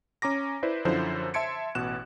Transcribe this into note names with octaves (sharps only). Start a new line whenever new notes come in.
C#4 A#5 D6 A#6
E4 B4 C5 D5
F#2 D3 F3 E4 C5
E5 A5 C6 G#6 C#7 D7
A1 B2 F#6 E7